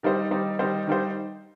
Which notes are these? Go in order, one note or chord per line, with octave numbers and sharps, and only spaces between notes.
D#3 G3 D#4 C5
D#3 G3 D#4 C5
D#3 G3 D#4 C5
D#3 G3 D#4 C5